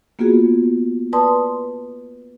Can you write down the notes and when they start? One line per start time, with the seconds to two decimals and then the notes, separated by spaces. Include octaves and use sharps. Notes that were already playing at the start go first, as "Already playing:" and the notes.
0.19 A#3 B3 F4 F#4 G#4
1.13 B4 D5 A5 C6 D#6